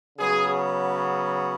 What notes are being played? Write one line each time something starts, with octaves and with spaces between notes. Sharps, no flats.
C#3 F#3 B3 G#4